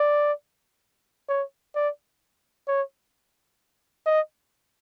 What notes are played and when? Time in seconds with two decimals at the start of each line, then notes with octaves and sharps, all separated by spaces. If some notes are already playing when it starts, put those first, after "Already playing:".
Already playing: D5
1.29 C#5
1.75 D5
2.68 C#5
4.07 D#5